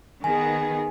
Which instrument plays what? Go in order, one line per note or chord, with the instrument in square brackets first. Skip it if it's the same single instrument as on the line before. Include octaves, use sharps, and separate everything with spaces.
[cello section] D#3 B3 G#4 [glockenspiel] G#5